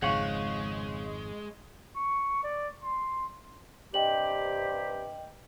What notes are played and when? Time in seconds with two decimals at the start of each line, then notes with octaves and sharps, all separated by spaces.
0.02 G#1 F2 G#2 C#3 G#3 F#5 C#6
1.96 C#6
2.44 D5
2.84 C6
3.94 G2 C3 G4 D#5 G5 F#7